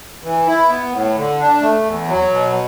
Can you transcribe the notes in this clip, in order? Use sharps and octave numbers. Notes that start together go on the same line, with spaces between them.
E3
E4
B3
A2
D3
D4
A3
E2
F#3
B2